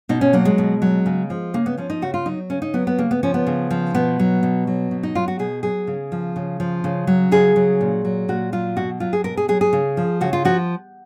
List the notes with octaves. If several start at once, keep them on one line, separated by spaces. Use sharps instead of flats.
B2 D#4
C#4
F#3 A#3
G#3
B2
F#3
C#3
F3
C#3 A#3
B3
F3 C#4
D#4
C#3 F#4
F4
F#3 D#4
C#3 C#4
D#4
F#3 B3
B3
C#3 A#3
B3
F3 C#4
B3
C#3
F3
B2 B3
F#3
B2
F#3
B2
D#4
F#3 F4
F#4
B2 G#4
F#3 G#4
C#3
F3
C#3
F3
C#3
F#3
C#3 G#4
F#3
A#2
F#3
A#2 F#4
F#3 F4
B2 F#4
F#3 F4
G#4
B2 A#4
G#4
F#3 G#4
G#4
C#3
F3
C#3 F#4
F4
F3 F#4